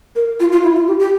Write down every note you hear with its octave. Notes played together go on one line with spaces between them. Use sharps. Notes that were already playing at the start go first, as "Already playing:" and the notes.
A#4
F4
F4
E4
F4
G4
G4